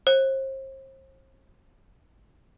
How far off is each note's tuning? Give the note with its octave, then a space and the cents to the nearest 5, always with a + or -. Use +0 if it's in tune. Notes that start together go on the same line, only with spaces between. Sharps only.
C5 +35